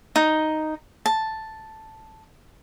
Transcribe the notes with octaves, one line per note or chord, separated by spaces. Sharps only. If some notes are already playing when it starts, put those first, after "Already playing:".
D#4
A5